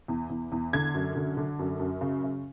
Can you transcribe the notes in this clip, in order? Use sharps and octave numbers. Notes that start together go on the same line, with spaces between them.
E2
E2
E2
D3 G#6
F#2
D3
D3
F#2
F#2
C#3
C#3